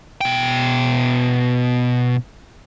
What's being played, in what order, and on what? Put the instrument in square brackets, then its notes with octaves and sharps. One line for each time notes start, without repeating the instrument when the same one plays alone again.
[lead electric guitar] B2 G5